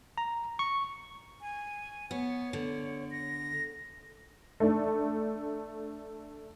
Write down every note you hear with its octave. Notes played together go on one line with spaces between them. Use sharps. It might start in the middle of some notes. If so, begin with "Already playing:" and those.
A#5
C#6
G#5
B3 C#5
D3
A#6
A3 D4